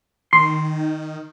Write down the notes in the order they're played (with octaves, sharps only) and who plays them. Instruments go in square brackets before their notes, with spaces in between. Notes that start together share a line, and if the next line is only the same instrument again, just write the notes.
[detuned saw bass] D#3 [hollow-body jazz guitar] C6